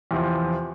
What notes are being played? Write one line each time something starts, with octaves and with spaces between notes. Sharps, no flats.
E2 C3 F3